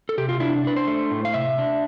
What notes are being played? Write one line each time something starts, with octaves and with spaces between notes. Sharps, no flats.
A4
C3 G4
F4
D4 E4
D4 B4
C5
A3
A2
F5
C3 E5
D4